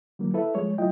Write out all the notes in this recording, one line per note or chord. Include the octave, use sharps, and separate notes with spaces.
D3 E3 F#3 A#3
E4 A4 B4 E5
F3 G#3 C#5
F#3 A3 E4 F4 D#5 G5